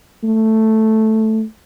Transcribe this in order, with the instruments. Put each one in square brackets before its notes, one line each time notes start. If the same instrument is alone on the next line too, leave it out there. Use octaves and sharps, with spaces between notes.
[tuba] A3